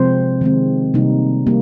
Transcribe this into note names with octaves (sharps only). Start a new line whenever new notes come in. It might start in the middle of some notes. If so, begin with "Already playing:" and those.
Already playing: C3 F3 G#3 C4 C5
D#3 G#3 C4
C3 G3 A#3 D#4
G3 A#3